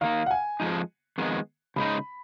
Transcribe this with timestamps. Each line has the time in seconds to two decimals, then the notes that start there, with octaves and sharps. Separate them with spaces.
0.01 D#3 A#3 D#4 F5
0.26 F#5
0.31 G#5
0.60 F2 F3 G#3 D#4
1.18 F2 D#3 G#3 B3
1.76 C#3 G#3 D#4 B5